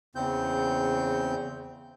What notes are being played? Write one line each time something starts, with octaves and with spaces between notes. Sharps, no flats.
E2 C#3 C4 G6